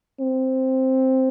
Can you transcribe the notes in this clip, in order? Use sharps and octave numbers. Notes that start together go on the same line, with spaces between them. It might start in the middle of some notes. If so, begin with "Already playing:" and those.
C4